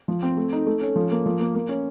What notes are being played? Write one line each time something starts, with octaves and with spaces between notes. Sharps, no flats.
F3
C4
A3
D#4
A3
C#4
F3
A#3
F3
A#3
A#3
C#4